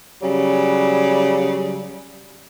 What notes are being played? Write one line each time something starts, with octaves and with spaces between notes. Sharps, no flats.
C#3 F#3 G3